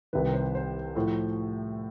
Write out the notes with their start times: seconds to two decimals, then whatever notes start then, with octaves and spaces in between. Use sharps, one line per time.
0.13 C2 C3 D#3 B4
0.34 C5
0.55 C5
0.95 A2 F3 A3 C5